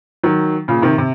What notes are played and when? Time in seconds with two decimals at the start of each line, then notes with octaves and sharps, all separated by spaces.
0.23 D#3 F#3
0.68 A#2 C#3
0.82 C3 D#3
0.98 C3